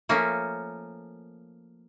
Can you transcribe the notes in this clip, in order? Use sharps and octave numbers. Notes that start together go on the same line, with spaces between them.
F3 A3 A#3 C#4